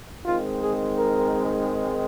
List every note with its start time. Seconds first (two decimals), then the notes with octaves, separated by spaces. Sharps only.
0.25 G#2 D#3 G#3 C4 F4
0.61 G#4
0.97 A#4